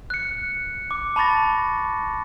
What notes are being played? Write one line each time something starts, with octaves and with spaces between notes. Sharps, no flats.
F#6 C#7
D6
A5 B5 C#6 A6 A#6